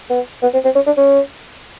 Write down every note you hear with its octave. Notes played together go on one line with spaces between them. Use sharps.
B3
B3
C4
C4
C#4
D4
C#4